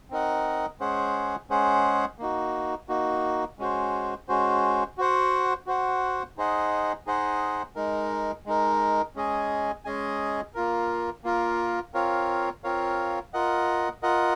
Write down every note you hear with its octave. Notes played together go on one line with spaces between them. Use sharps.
C4 D#4 A#4 D#5 F#5
G#3 C#4 G#4 C5 F#5
G#3 C#4 G#4 C5 F#5
A#3 D#4 F#4
A#3 D#4 F#4
G#3 C#4 F#4 C5
G#3 C#4 F#4 C5
F#4 C5 F#5
F#4 C5 F#5
D#4 G#4 C5 D#5 F#5
D#4 G#4 C5 D#5 F#5
G#3 D#4 A#4
G#3 D#4 A#4
G#3 C#4 G#4 D#5 G#5
G#3 C#4 G#4 D#5 G#5
A#3 F4 A#4
A#3 F4 A#4
C4 F4 A#4 C#5 F5
C4 F4 A#4 C#5 F5
F4 A#4 D#5 F#5
F4 A#4 D#5 F#5